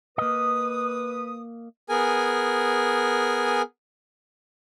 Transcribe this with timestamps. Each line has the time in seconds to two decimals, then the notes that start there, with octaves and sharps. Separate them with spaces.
0.18 A#3 B4 D#5 D#6
1.89 B3 G#4 A#4 G#5